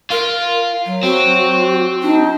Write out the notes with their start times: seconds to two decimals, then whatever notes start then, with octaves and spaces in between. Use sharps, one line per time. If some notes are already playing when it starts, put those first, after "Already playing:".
0.11 F4 A#4
0.86 F#3
1.03 C4 F#4
2.02 D4 D#4